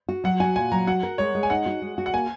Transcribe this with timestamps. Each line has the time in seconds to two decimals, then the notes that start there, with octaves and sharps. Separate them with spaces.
0.09 F#4
0.24 F#3 F#5
0.40 F#4 G#5
0.56 A#2 G#5
0.72 F#3 A#5
0.87 F#4 F#5
1.03 A#4
1.18 G#3 C#5
1.35 G#3
1.43 G#5
1.50 D#4 F#5
1.66 F#4
1.82 G#3
1.98 F#4
2.06 F#5
2.13 A#3 G#5